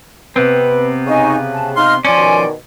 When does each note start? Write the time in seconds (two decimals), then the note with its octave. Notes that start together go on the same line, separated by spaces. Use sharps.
0.36 C3 B3 C4 B4
1.07 C#3 D#4 G#5 C#6
1.53 A5
1.76 D#4 F5 C6 F6
2.05 F3 C#4 D5 G#5 C6
2.17 B2 D#3